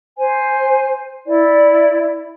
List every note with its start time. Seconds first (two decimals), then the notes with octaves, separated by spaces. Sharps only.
0.17 C5 G#5
1.27 E4 D5